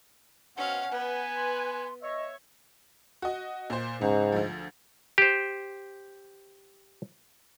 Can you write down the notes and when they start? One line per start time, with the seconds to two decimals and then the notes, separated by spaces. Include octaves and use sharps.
0.57 B2 C4 C#4 F5 F#5
0.91 B3 B4 G#5
1.36 C6
2.02 C#5 D#5 E5
3.22 F#4 D#5
3.70 A#2 C5
4.01 C#2 G#2
4.32 D2 F3
5.18 G4 C5